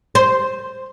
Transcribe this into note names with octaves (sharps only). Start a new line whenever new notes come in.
C5